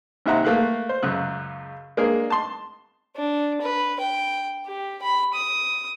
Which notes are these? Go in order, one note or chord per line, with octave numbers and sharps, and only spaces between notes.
G#1 D#2 C3 E5 F#5 A#5
A3 A#3 F5 F#6
C5
C#2 F#2 C#3 F#6
G#3 A#3 D4 G#4 A#4
A5 C6
D4
B4
G5
G4
B5
D#6